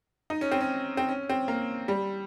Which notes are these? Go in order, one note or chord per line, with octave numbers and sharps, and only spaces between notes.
D#4
C#4
C4
C#4
C4
C#4
C4
A#3
G3